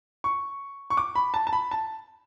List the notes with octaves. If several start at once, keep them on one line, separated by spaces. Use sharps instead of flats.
C#6
C#6
D6
B5
A5
A5
B5
A5